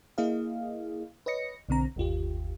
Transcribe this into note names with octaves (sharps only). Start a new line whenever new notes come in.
A#3 E4 G#4 D#5 F5
B4 C#5 D#5 A#6 C#7
B1 D3 C4 A#5
G1 D#2 F4 G4